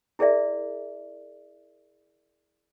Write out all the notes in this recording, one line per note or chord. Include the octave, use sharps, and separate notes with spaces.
E4 G#4 A#4 D5 E5